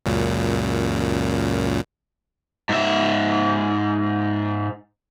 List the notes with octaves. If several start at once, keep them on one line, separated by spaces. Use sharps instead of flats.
C#2 F#2 A#2
G#2 E5